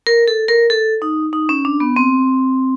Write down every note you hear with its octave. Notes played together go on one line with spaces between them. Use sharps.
A#4
A4
A#4
A4
D#4
D#4
C#4
D4
B3
C4